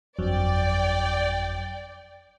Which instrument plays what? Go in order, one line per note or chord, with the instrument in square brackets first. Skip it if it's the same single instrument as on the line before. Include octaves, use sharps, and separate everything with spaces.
[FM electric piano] G1 F2 F#3 [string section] D5 G5